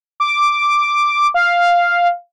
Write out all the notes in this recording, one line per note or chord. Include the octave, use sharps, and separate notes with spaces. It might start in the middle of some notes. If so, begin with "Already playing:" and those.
D6
F5